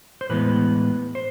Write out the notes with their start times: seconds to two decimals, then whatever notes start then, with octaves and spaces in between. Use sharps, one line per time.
0.21 C5
0.29 A2 E3 G#3 B3 B4
1.15 C5